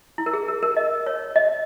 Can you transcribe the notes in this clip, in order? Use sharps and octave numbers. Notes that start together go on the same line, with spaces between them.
E4
A#4
G#4
A#4
A#4
D#5
C#5
D#5